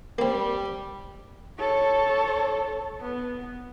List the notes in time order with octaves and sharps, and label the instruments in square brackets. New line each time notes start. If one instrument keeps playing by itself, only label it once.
[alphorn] G3 [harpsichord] A#3 C4
[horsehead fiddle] A4 C#5
B3